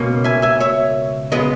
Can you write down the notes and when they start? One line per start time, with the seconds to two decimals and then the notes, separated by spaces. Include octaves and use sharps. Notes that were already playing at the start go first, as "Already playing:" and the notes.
Already playing: C#2 B2 A#3 C#4
0.24 E5 G#5
0.42 E5 G#5
0.60 C#5 E5
1.32 C#3 G#3 B3 B4 D#5